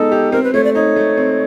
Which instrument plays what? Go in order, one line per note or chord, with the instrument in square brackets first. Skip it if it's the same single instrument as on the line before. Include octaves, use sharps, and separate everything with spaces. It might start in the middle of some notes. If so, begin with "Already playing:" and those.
Already playing: [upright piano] G#3 B3 D#4 [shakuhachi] A4
[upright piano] G4
[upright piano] C4 [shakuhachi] A#4
[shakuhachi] B4
[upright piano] A3 [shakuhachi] C#5
[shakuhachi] D5
[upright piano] D#4 [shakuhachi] C#5
[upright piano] A3
C4